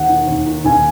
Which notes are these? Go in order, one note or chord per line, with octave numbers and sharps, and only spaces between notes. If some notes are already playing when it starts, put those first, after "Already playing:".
Already playing: D#2 F#5
D#3
D#2
D#3
D#2 G#5